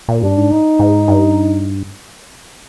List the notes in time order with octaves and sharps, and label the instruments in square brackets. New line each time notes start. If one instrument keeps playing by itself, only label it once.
[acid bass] A#2
[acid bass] G2 [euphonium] D4
[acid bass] G#2
[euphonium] D#4
[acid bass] G#2
G2